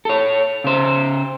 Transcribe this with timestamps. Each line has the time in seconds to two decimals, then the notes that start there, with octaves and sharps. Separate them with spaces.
0.05 A4 C#5
0.64 C#3 C5